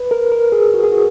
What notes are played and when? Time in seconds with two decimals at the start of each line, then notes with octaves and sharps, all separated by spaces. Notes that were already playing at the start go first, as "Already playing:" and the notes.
Already playing: B4
0.11 A#4
0.32 A#4
0.52 G#4
0.74 F#4
0.83 G#4
0.92 F#4